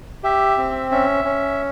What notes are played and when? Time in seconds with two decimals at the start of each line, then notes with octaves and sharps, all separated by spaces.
0.23 G4 E5
0.58 C4
0.91 C#4 E5
1.25 C#4